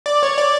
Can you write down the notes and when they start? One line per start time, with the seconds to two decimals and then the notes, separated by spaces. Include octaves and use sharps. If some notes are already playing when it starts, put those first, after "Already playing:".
0.06 D5
0.23 C#5
0.38 D5